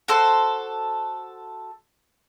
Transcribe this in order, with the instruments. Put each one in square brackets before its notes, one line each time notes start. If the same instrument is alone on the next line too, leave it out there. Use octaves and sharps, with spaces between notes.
[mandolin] F#4 A4 C5